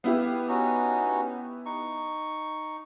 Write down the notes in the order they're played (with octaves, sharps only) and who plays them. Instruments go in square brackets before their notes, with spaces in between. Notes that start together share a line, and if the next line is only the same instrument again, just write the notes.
[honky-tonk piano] B3 E4 G4 [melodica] F5
[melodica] C#4 D#4 F#4
D#4 C#6